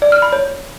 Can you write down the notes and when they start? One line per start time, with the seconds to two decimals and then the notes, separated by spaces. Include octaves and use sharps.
0.02 D5
0.12 F6
0.22 B5
0.32 C#5